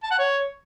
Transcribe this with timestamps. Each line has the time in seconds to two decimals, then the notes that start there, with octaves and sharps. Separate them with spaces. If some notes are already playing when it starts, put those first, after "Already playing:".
0.03 A5
0.11 F#5
0.18 C#5